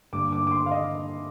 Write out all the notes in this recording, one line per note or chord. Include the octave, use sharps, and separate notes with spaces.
G2 D3 G3 A#3 D4 D6
D6
D6
C6
F5
D#5